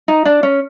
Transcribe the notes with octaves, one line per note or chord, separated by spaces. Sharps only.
D#4
D4
C#4